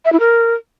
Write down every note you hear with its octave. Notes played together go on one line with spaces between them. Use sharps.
E5
E4
A#4